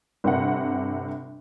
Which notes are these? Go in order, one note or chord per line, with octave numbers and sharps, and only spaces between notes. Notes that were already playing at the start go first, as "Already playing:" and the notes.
G1 C3 F#5